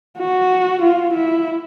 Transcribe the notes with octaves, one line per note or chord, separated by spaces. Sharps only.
F#4
F4
E4